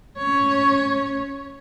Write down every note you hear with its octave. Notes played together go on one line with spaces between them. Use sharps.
C#4 C#5